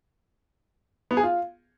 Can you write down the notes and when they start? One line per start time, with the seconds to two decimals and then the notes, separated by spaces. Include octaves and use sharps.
1.11 B3
1.17 G#4
1.23 F4